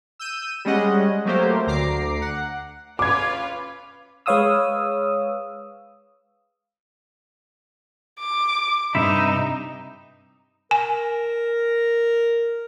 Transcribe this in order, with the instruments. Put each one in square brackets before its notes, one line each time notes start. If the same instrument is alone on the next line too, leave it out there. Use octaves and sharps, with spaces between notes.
[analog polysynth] E6 G6 D#7 E7
G3 G#3 C#4 D#5 F#5
F#3 A3 A#3 C4 G4 C5
D2 A#5 D6 C7
F#5
[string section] C#4 F4 B4 [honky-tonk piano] D6 G#6
[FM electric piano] G#3 B4 C#5 F5 D#6 E6
[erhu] D6
[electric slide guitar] G2 C3 E4 [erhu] D#4
[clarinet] A#4 [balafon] G#5